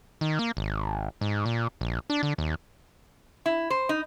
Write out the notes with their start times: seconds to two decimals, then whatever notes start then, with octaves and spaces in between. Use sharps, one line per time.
0.21 D#3
0.39 A#3
0.57 G#1
1.21 G#2
1.45 A#2
1.81 A#1
2.10 D4
2.23 D3
2.38 D#2
3.46 E4
3.70 C5
3.89 D#4